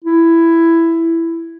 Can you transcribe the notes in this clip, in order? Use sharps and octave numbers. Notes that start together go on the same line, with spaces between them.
E4